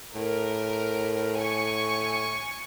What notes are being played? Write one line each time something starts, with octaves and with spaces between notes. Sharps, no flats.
A2 A#4
G#5 C#6